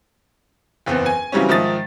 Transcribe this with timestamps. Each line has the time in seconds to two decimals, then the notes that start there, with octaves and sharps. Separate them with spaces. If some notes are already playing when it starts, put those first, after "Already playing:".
0.86 F#1 E2 B3 C4
1.06 G#5
1.32 C#3 E3 F#3 G3 C4 C#4
1.49 G#2 D#3 F3 E5 D#6 A6